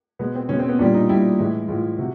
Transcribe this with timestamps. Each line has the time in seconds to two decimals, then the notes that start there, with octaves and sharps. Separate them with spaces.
0.19 B2 G#3 B3
0.35 C4
0.49 B2 G#3 C#4
0.59 C4
0.69 B3
0.79 A#2 G3 D4
0.94 D#4
1.09 A#2 G3 E4
1.39 A2 E3 G#3
1.68 A2 E3 G#3 F4
1.98 C3 F#4